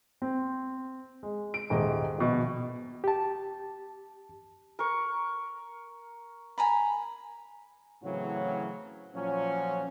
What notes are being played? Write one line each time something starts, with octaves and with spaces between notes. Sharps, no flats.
C4
G#3
D7
D#1 G#2 D#5
A#1 B2
G4 A5
A#4 C#6
G#5 A#5 B5
A2 C#3 E3 F#3 C4 F#4
A#2 F3 F#3 C#4